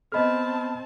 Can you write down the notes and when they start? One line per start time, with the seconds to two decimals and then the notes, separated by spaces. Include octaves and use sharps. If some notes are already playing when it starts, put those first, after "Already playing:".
0.12 B3 C4 A4 D#5 A5 B5 F6